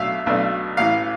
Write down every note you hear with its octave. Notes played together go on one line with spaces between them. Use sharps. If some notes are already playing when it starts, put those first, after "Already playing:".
Already playing: B1 B2 A3 D4 E5 F5
B1 B2 A3 D4
A1 A2 E3 F5